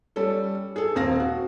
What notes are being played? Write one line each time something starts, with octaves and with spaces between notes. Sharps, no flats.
G3 C#4 A4
G#4 A4
D#1 C4 F5 A#6
F#4